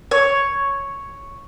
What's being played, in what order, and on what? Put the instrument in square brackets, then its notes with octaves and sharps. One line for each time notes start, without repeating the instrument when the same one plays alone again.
[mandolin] C#5